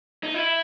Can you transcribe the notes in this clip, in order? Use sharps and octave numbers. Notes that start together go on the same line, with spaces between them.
D#4
E4